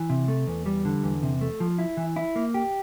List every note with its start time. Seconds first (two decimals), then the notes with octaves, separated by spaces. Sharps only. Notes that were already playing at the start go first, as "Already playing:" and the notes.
Already playing: E3
0.10 C3
0.28 A3
0.47 E2
0.66 G3
0.85 D3
1.03 E2
1.22 C3
1.41 A3
1.60 F3
1.78 E4
1.97 E3
2.16 E4
2.36 A#3
2.54 G4